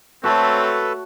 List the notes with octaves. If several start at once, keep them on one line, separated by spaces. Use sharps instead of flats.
A3 C4 F#4 A4 B4 C#5 A5